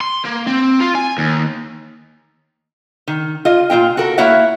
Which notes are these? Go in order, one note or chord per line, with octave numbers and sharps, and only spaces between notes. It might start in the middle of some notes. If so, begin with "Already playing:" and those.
C6
A#3
C4
F4
G#5
D#2
D#3
F4 D#5
A#2 A#3 F4 G5
F#4 A4 A#4
A#3 E4 F#4 C#5 E5 F#5